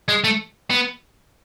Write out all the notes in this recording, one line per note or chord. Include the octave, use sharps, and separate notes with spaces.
G#3
A3
B3